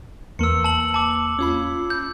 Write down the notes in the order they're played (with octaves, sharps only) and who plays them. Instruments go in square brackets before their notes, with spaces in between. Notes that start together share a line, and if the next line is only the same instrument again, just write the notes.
[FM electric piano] E2 A#3 [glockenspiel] E6 C#7
[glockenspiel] A5 F#7
A5 D6
[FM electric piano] C#4 F4 B5
[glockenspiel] G6